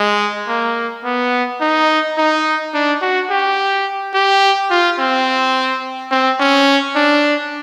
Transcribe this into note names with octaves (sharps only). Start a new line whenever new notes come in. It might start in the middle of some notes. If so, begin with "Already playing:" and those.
Already playing: G#3
A#3
B3
D#4
D#4
D4
F#4
G4
G4
F4
C4
C4
C#4
D4